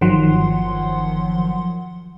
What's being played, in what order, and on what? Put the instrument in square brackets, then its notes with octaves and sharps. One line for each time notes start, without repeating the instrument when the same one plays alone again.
[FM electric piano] G1 D#3 F3 F#3 F#5 C6